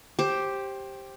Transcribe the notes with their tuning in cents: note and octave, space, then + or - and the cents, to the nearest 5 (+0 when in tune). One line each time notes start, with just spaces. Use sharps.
G4 +0 C5 +20